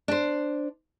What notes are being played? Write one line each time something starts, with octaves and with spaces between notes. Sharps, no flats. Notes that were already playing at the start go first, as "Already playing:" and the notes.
D4 C5